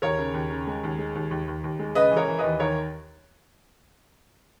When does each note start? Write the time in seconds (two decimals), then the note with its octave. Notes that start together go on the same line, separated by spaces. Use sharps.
0.02 D#2 A#4 C#5
0.19 C#3
0.34 D#2
0.51 C#3
0.67 G#3
0.83 D#2
0.99 G#3
1.15 D#2
1.31 D#2
1.48 D#2
1.64 D#2
1.79 G#3
1.95 C#3 B4 D#5
2.11 E3
2.17 A#4 C#5
2.28 E3
2.39 D#2 B4 D#5
2.60 D#3 A#4 C#5